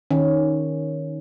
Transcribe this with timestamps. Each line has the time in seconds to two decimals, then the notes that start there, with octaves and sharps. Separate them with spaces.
0.11 D#3 C#4